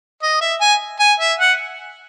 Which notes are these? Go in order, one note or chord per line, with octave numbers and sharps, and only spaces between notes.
D#5
E5
G#5
G#5
E5
F#5